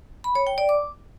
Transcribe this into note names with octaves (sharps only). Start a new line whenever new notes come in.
B5
C#5
G5
D5
D6